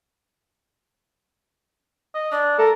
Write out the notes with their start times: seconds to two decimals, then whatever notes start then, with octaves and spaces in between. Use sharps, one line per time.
2.14 D#5
2.32 D4 D5
2.58 A4 A#4